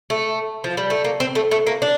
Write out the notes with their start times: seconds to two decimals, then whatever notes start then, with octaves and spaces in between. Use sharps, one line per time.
0.10 A3
0.64 F3
0.77 G3
0.90 A3
1.04 A#3
1.20 C4
1.35 A3
1.51 A3
1.67 A#3
1.82 D4